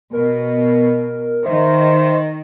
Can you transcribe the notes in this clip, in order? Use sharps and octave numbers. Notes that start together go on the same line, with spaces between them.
B2 A#4
D#3 C5 E5